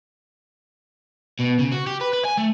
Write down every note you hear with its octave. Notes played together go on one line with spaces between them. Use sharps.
B2
C#3
F#4
G4
B4
B4
G#5
A3